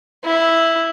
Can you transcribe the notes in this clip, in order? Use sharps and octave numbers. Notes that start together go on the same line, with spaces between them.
E4